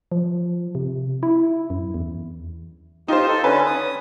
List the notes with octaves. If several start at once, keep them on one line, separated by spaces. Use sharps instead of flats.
F3
C3
E4
F#2
E2
D#4 F4 G4 C5
A4
D3 C#4 B4 G#5
D#6